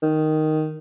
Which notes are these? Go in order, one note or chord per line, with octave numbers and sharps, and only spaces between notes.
D#3